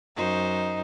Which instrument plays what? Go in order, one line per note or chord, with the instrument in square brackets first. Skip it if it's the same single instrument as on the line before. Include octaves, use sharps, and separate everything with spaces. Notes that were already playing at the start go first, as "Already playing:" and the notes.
[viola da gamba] F#2 C5 [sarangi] D#4